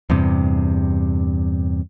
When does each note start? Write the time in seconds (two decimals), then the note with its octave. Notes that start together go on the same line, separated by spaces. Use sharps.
0.10 E2 G2 C3